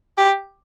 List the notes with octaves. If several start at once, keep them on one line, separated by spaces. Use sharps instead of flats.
G4